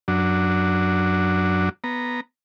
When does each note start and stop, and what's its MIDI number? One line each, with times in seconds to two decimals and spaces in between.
0.08 1.69 42
0.08 1.69 54
0.08 1.69 62
1.84 2.21 59
1.84 2.21 82